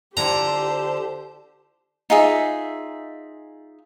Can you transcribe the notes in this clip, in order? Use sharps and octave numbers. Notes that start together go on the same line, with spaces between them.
D3 E4 F4 G4 C5 A5 A#5
D#4 F4 G#4 E5